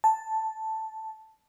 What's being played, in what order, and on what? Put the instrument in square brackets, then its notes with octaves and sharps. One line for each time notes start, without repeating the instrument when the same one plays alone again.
[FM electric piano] A5